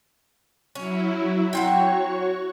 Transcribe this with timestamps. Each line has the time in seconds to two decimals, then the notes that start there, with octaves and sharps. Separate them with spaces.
0.75 F#3 C#4 E4
1.53 F#3 C4 F#4 C#5 G5 C#6